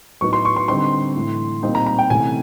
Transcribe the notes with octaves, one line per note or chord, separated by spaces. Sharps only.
A2 F#3 B3 D#4 C#6
C6
C#6
C6
D3 G3 C4 D#4 C6
A2 E3 A3
A#2 G3 C4 D#4
A#5
A#5
G5
C3 E3 A3 C#4 G#5